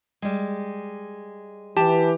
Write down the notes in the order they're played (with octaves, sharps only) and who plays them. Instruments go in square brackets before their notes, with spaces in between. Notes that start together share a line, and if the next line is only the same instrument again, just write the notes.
[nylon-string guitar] G3 G#3
[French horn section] E3 [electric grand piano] G4 [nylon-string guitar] A5